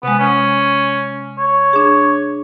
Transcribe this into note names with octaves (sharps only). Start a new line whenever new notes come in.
C3 G#3 B3
C#4
C#5
D4 G#4